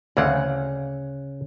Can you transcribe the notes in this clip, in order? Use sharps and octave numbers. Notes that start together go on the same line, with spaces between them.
D2 C#3 E3 C4 F#5